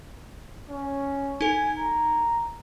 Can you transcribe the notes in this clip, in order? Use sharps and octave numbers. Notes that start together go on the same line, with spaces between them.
C#4
D#4 A4 G#5
A#5